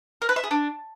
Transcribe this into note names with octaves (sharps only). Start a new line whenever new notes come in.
A#4
B4
E5
G#4
D4